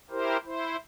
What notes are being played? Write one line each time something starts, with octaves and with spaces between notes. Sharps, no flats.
E4 G4 A#4 C5
E4 C5